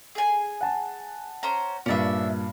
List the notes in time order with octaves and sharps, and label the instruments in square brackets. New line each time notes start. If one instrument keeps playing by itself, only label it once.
[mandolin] G#4 G#5
[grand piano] F#5 A5
[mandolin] C#4 C5 A#5
[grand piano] G2 A#2 [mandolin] C#4 D4 E5